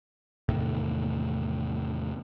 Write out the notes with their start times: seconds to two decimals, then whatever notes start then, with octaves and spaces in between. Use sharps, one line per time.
0.49 E2 A2 C3 D#3